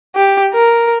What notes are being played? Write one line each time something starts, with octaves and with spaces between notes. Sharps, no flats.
G4
A#4